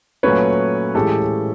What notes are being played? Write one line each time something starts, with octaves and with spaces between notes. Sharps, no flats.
A#2 F#3 A3 C#4 B4 C#5
A2 E3 G#3 C#4 G4 A4